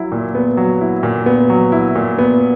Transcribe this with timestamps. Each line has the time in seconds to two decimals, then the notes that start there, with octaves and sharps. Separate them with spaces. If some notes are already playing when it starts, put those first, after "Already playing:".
Already playing: F#3 E4
0.12 A#2
0.35 B3
0.57 F#3
0.81 E4
1.03 A#2
1.26 B3
1.50 F#3
1.72 E4
1.96 A#2
2.19 B3